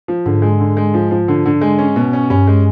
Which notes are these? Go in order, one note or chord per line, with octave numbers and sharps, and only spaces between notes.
F3
G#2 D3
G#3
D3
G#3
F3
F3
D3
D3
G#3
C#4
B2
C#4
G2 C#4
G#3